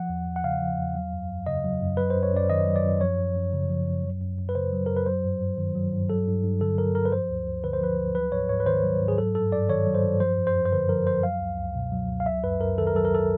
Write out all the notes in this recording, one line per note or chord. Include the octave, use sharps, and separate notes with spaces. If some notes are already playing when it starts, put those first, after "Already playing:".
Already playing: F3 F#5
E2
E2
F#5
C#3 F5
F3
E2
F#3
F#2
F#2
C#3 D#5
F#3
F#2
F#3 B4
C5
F#2
C#5
F#2 D5
D#3 D#5
F#3
D5
F#2
F3 C#5
F#2
F#2
C#3
F3
F#2
F#3
F#2
F#2
B4
C#3 C5
F#3
F#2 A#4
B4
F#3 C5
G2
G2
D#3
F#3
G2
F#3 A4
G2
G2
D3 A4
F#3 A#4
G2 A#4
B4
F3 C5
D2
D2
D3 B4
C5
F3 B4
D2
F#3 B4
G#2 C#5
G#2 C#5
B4
D#3 C5
F#3
G#2
G#4
F#3 A4
G2 A4
G2 D5
D#3 C#5
F#3
C5
G2
F3 C5
F#2
C5
F#2
C5
D3 B4
F3 A#4
F#2 C5
F#3 F5
C#2
C#2
B2
F#3
C#2
F5
F#3 E5
F#2 B4
F#2 A#4
D#3 A4
A#4
F#3 A4
A#4
A4